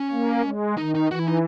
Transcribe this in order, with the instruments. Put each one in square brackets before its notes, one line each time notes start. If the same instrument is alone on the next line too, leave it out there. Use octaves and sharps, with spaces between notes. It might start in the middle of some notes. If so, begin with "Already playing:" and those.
Already playing: [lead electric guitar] C#4
[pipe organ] A#3
G#3
[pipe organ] D#3 [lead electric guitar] D#4
[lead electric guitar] D#4
[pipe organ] E3 [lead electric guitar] F#4
[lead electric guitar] E4
D#4